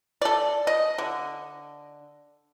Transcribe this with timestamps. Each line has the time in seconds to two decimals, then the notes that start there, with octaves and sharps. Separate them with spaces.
0.22 A4 D5
0.67 D#5
0.98 D3